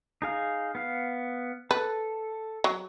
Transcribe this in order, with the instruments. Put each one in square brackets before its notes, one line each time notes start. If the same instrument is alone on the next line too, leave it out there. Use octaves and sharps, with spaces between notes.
[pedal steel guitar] D#4 G#4 F5
B3 F5
[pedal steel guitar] A4 [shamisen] B4
[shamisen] F#3